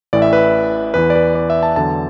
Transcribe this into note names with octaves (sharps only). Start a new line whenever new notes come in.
A1 A2 E3 D5
E5
B4
E2 E3 B4
D5
B4
D5
E5
A5
E2 D3 F#3 A5